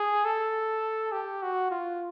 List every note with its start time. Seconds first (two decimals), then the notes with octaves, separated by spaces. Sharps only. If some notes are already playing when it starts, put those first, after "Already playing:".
Already playing: G#4
0.25 A4
1.12 G4
1.43 F#4
1.71 F4